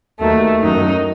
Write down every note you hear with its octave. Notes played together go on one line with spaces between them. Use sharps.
D#2 D#3 F#3 A3
F#2 D#3 F#3 D#4